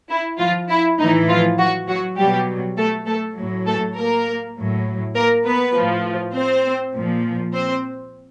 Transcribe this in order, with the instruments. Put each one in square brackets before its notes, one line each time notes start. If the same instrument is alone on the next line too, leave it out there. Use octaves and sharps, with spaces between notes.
[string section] E4
F3 F4
E4
A2 E3 D#4
F3 F4
F#3 F#4
F#3 F#4
B2 F#3 G3 G4
A3 A4
A3 A4
A2 F#3
A3 A4
A#3 A#4
A2 F#3
A#3 A#4
B3 B4
A2 F3
C4 C5
A#2 F3
C4 C5